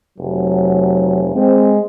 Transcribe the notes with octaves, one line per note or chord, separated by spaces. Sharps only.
F1 F#3
G#3 C4